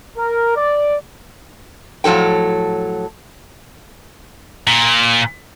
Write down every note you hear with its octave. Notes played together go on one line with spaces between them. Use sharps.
A#4
D5
A2 F3 F#3 A4 G5
A#2